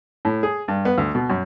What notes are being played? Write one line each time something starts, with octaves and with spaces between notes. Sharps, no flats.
A2
G#4
G2
B3
D2
B2
F#2